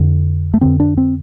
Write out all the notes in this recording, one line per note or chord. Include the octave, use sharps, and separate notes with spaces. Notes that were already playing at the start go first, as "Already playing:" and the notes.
Already playing: F2 D3
A3
F2 D3 C4
D4
C4